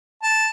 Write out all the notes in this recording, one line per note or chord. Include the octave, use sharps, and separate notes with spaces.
A5